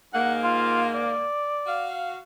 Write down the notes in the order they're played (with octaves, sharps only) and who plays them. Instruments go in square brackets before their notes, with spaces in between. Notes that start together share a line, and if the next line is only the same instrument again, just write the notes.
[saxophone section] G#2 A#3 [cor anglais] F#5
[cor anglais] F4
D5
[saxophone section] F#4 F5